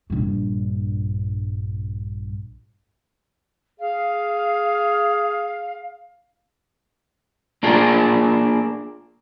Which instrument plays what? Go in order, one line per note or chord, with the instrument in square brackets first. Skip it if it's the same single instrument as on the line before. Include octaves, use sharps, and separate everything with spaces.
[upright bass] A#1 G2
[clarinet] G#4 [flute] F5
[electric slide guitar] A#3 D4 F4 G#4 A#4